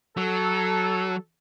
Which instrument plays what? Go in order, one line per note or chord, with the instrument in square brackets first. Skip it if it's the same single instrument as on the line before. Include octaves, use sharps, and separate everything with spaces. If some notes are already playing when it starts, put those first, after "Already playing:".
[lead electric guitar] F#3 [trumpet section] A4